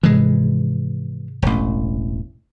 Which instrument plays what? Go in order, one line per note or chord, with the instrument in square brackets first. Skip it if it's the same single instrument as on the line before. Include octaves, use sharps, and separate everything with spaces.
[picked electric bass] G#2 C3 F3 [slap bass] E3 G#3
[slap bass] E1 A1